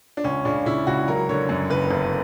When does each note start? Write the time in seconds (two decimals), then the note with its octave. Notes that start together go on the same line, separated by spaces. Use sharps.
0.17 D4
0.24 C#2 C#4
0.45 C#3 D4
0.66 C#3 E4
0.87 C#2 F#4
1.08 F#3 A#4
1.29 D3 C#5
1.49 F#2
1.70 F#1 B4
1.90 G1